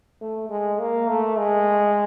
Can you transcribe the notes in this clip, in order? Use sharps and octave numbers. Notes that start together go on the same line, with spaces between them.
A3
G#3
A#3
A3
G#3